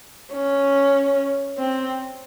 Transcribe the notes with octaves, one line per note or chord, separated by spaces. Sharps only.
C#4
C4